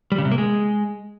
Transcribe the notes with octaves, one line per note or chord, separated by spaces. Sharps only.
G3
C#3
C3
A#3
G#3